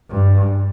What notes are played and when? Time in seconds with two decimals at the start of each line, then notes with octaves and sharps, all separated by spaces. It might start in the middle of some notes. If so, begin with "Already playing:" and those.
0.10 G2